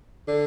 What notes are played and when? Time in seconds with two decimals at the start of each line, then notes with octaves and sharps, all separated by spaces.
0.28 D3